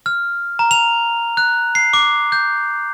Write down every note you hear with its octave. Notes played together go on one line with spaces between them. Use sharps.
F6
A#5
F7
F#6
C7
D6
G6